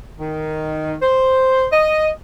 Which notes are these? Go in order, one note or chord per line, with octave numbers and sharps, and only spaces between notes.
D#3
C5
D#5